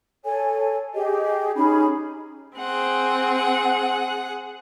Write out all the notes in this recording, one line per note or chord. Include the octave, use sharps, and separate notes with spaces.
A4 C#5 G#5
G4 G#4 D#5
C#4 D#4 G#4 B5
C4 G#4 F#5